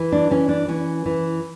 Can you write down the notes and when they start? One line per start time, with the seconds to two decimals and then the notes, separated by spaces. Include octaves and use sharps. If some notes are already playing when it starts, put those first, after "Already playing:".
Already playing: E3
0.12 D4
0.31 E3 C#4
0.49 D4
0.68 E3 C#4
1.06 E3